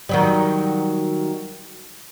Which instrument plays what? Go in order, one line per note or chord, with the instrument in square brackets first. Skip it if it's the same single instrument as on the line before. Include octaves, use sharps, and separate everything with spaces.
[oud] D#3 F#3 G3